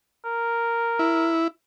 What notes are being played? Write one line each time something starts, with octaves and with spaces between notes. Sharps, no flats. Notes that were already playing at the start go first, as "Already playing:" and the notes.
A#4
E4